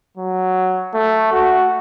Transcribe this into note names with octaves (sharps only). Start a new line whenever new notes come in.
F#3
A3
F#4